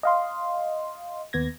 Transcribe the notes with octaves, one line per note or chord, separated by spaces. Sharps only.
D#5 F5 C6
D#2 B3 G#6 A#6